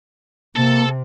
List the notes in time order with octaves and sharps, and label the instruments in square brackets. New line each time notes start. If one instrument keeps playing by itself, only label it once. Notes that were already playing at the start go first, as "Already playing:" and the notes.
[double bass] C3 [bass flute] A#3 [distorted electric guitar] A4 A5